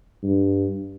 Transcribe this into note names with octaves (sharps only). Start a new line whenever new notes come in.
G2